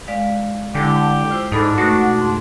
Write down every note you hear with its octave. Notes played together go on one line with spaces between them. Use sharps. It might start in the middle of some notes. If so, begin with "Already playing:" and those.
G#3 D5 F5
D3 G#3 E4 G4
F4 C5 E6
G#2 D4 D#4 A4 B5
B2 A3 F#4 A#6
F2 G#2